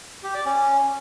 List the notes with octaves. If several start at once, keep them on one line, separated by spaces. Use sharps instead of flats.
G4
D5
C#4